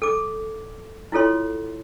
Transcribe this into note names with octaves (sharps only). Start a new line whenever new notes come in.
A4 D6
E4 F4 A4 C#5 C6